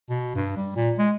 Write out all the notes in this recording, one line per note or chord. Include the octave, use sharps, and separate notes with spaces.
B2
G2
G3
A#2
G#3